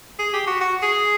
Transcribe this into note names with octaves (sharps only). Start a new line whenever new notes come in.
G#4
G4
F#4
F#4
G#4